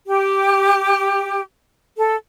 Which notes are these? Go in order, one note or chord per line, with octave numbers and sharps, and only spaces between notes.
G4
A4